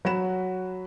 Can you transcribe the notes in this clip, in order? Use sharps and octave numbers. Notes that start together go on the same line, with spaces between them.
F#3 F#4 B5 E7